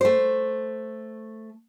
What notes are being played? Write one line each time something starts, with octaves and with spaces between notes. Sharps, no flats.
A3 C5